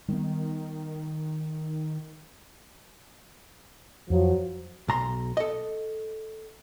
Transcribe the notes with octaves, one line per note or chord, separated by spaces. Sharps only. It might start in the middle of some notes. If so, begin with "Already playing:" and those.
D#3 G3 A3 B3
F2 F3 F#3
B1 A#5 C6
A4 D#5